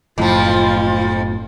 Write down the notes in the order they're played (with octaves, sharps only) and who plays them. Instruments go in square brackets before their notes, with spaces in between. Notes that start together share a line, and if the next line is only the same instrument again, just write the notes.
[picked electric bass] F#1 A2 [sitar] F2 F3 [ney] F4